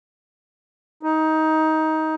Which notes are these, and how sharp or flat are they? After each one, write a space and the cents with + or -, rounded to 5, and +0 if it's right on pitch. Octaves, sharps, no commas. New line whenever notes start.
D#4 +15